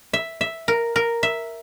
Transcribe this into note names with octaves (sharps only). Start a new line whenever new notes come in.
E5
E5
A#4
A#4
E5